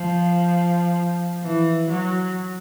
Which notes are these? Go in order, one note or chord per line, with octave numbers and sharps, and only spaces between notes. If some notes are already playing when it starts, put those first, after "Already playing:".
Already playing: F3
E3
F#3